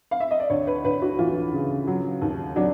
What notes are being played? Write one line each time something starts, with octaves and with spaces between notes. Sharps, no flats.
F5
E5
D#5
D5
D2 C#5
B4
D2 B4
F#4
E3 F4
C#3
F#3
D#2
F#3 D4